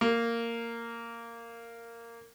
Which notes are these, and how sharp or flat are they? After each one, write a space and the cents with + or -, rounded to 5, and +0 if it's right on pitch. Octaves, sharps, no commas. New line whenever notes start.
A#3 -10